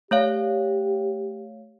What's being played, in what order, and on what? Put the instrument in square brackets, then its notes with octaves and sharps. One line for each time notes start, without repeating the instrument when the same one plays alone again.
[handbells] A3 C#5 F5 [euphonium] G4